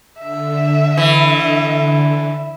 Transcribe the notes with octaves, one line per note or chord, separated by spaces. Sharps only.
D3 E5
E3